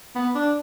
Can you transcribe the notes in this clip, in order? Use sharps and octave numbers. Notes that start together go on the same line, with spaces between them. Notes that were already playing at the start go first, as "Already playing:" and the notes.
B3
D4